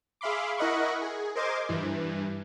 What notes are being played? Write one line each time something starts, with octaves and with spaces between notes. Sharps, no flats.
G#4 E5 F5 B5 C6 D6
E4 A#4 D#5 F#5 B5 C#6
G#4
A#4 C5 D#5 C6 D6 G#6
G2 E3